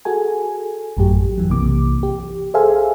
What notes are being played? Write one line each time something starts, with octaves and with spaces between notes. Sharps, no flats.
F#4 G#4 A4 G#5
A1 F#2 A2 F#3 G4
E3 F#3
B1 C3 E3 A#3 D6
G4
G#4 A4 C5 E5 F5 G#5